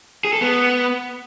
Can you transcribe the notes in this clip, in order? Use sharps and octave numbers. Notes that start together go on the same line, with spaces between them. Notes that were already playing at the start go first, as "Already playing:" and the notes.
G#4
A4
B3